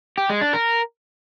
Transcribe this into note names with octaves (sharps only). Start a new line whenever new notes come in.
G4
G#3
D4
A#4